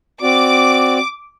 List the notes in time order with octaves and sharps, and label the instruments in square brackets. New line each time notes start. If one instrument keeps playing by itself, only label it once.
[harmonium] C4 F#4 D5 [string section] D6